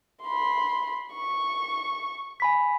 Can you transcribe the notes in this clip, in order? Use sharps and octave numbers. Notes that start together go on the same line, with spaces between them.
B5 C6
C#6
G#5 B5 B6